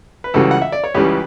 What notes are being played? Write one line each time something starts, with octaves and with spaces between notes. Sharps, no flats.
B4
C#2 C#3 E3 G3 F#4 A4
F#5
E5
D5
C#5
C#2 C#3 E3 G3 G4 B4